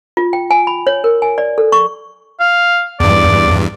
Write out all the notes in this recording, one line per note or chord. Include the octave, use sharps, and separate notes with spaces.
F4
G5
G#5
B5
C#5
A#4
G#5
D5
A4
C#6
F5
E2 G2 D5